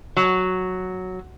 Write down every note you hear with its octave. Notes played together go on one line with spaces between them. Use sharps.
F#3